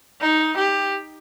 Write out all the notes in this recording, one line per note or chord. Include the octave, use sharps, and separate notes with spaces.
D#4
G4